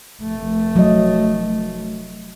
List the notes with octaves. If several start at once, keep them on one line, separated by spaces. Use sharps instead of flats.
F1 A3
F#3 D#5